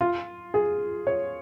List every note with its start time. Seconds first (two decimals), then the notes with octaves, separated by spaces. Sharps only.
0.01 F4
0.54 G#4
1.07 C#5